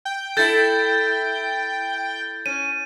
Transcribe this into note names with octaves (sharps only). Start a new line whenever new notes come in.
G5
E4 A4 G6 A6
C#4 D#7